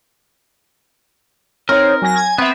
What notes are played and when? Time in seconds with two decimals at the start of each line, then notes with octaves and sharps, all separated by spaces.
1.69 C4 D#4 A#4 C#5
2.02 F#3 G#5 A#6
2.16 G#6
2.38 B3 C4 E5